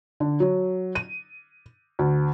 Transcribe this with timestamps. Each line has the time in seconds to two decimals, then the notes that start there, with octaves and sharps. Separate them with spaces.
0.20 D3
0.40 F#3
0.95 D#7
1.99 D2